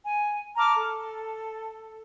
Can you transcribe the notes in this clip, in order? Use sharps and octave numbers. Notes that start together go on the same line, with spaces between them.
G#5
A5 A#5 D6 F6
A4